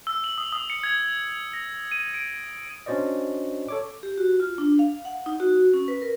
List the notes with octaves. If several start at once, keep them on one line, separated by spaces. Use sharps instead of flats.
E6
F#7
D#6
D#6
C#7
G#6
A#6
D#7
D7
C#4 D4 F#4 C5 D5 D#5
A4 C#5 D6
G4
F#4
F4
D4
F5
F#5
D#4
F#4
C#4
B4
A#4